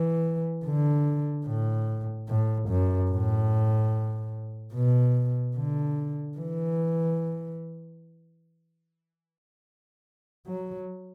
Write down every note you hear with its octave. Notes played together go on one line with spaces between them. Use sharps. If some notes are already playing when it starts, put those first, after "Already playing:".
Already playing: E3
D3
A2
A2
F#2
A2
B2
D3
E3
F#3